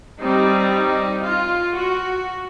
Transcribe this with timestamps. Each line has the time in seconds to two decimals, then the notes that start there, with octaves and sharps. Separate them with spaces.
0.20 G3 C4 D#4
0.72 D#4
1.24 F4
1.76 F#4